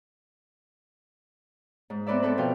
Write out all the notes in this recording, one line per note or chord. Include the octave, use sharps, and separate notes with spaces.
G#2
B3 C4 B4 D5 E5
B3 C4 A4 B4
B2 F3 F5 G5